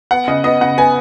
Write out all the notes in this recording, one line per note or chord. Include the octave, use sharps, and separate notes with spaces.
B3 F#5
C#3 D#5
B3 D#5
C#3 F#5
B3 G#5